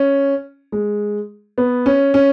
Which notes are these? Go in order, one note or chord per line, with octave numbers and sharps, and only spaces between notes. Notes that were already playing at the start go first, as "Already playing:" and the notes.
Already playing: C#4
G#3
B3
C#4
C#4